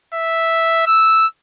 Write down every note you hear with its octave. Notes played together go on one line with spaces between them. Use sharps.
E5
E6